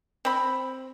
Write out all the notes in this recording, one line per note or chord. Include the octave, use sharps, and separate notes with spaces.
C4 B5